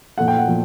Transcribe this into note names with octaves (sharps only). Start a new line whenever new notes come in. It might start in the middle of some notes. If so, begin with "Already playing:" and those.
A#2 F3 A3 F#5
G5
F#5
A#2 F3 A3